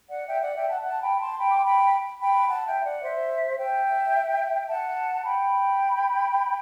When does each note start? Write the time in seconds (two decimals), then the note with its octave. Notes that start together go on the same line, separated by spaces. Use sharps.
0.09 D5 F#5
0.27 E5 G5
0.41 D5 F#5
0.55 E5 G5
0.69 F#5 A5
0.82 F#5 A5
1.02 G5 B5
1.19 A5 C6
1.39 G5 B5
1.50 D6
1.57 C6
1.65 G5 B5
2.20 G5 B5
2.48 F#5 A5
2.66 E5 G5
2.85 D5 F#5
3.03 C5 E5
3.58 E5 G5
4.69 F#5 A5
5.24 G5 B5